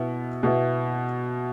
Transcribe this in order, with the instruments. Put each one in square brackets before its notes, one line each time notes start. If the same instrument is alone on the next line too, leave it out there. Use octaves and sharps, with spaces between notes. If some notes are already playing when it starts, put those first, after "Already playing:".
Already playing: [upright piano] B2 B3 E4
B2 B3 E4